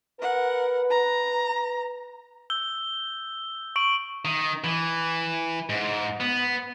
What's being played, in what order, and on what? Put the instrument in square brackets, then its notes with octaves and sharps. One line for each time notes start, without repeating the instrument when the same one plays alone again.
[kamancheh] A#4 F#5 [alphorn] B4
[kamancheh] A#5
[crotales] E6 G6 G7
C#6 D7 F#7
[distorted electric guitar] D#3
E3
G#2
B3